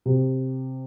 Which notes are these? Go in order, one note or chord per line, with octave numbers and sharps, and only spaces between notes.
C3